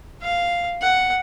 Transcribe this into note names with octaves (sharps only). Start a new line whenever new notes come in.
F5
F#5